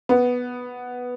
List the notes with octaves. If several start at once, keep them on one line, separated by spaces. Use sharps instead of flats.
B3